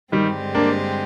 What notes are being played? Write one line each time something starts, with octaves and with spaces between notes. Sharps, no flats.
G2 D3 D#3 G3 G#3 C4 G4
A#3 D4